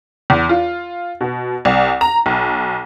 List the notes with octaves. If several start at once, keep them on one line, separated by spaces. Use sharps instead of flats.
E2
F4
B2
C2
A#5
B1